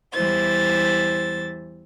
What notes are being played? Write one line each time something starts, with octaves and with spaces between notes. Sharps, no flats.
E2 E3 G3 E4 C5 A6